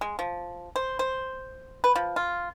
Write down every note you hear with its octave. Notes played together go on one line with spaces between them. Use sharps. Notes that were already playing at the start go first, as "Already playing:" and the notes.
G#3
F3
C5
C5
B4
F3
F4